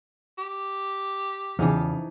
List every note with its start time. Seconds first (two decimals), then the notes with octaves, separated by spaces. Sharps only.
0.38 G4
1.59 E2 C#3 E3 F3 D#4